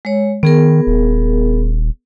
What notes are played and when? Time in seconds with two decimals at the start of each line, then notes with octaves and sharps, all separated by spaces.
0.05 G#3 C#5
0.43 D#3 B3 G#4 A#4
0.87 D#1